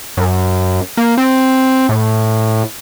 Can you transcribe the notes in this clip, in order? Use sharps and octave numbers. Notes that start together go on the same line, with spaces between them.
F#2
A#3
C4
A2